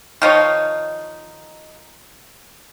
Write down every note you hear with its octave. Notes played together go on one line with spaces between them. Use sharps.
D#3 F3 D#4 C#5